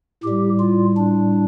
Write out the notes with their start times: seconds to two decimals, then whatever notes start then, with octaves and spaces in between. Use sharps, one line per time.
0.24 A2 G3 G4
0.60 F4
0.97 D4